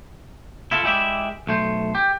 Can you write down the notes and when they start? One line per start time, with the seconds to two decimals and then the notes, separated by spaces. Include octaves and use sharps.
0.71 E4 F4 A4
0.84 G#3 E4 G4 D5 E5
1.47 B1 A3 C5
1.95 G4